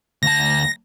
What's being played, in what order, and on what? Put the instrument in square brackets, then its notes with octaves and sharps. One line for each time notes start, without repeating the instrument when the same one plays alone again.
[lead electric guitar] D2 A5 [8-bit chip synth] A#6